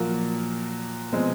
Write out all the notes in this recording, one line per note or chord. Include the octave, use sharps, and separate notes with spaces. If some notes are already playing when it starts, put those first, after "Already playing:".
Already playing: A#2 F3 F#3 A#3
B2 F3 G#3 C4